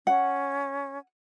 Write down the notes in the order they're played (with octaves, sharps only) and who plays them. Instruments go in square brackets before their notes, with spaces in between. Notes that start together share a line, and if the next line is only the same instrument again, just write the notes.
[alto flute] C#4 [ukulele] F#5